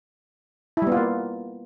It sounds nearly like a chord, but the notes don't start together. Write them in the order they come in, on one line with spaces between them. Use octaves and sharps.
E4 G3 B3 F4 A#3